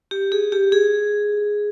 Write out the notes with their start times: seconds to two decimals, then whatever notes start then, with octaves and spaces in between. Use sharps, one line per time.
0.11 G4
0.32 G#4
0.52 G4
0.72 G#4